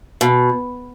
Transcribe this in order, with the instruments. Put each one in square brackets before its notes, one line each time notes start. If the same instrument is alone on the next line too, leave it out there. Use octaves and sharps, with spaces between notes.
[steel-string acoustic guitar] B2